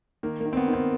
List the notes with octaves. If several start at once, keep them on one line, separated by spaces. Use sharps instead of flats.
D#3 A#3
A#3
D#3
C4
B3
D#3
C4